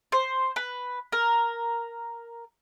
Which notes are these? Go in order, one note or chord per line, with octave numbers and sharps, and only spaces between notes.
C5
B4
A#4